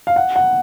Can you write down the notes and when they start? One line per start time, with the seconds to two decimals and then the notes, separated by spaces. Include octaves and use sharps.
0.07 F5
0.16 F#5
0.36 F#5